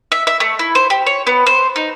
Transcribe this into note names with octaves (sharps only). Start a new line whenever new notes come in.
E5
E5
A3
E4
C5
G4
C#5
B3
C5
D#4